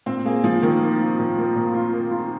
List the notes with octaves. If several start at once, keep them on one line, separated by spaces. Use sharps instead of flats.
A#2 C4
A#3 G#4
A#2 F3
D#3 A#3
A#3
F4
A#2
A#3
A#2
F4
A#3
F4